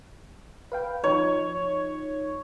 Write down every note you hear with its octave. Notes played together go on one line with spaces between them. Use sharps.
B4 F5 G5
F3 D#4 C#5